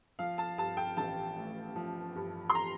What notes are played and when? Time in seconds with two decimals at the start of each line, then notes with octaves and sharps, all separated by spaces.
0.19 F3 F5
0.38 A5
0.58 G2 A5
0.77 G5
0.97 A1 A5
1.36 A3
1.76 F3
2.15 G2
2.50 C6
2.55 A#5